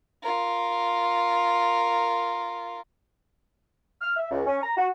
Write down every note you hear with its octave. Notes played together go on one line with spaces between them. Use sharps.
F4 A#4
F6
E5
C#2
C#4
A#5
F#4